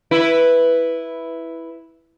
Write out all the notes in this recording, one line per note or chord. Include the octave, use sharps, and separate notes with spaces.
E4 B4